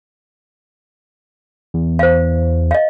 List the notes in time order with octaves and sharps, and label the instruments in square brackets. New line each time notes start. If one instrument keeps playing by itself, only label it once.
[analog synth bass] E2
[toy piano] C5 F5
D#5 F5